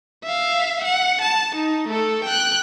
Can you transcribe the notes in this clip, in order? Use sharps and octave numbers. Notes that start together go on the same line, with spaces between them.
E5 F5
F#5
A5
D#4
A3 A4
G5 F#6